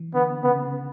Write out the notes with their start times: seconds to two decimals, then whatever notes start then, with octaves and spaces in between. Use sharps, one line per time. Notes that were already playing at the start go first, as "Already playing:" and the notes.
Already playing: E3
0.14 D3 B3
0.43 C#3 B3
0.63 C#3